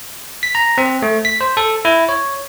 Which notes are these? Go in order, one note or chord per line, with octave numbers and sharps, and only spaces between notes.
B6
A#5
C4
A3
B6
C5
A4
E4
C#5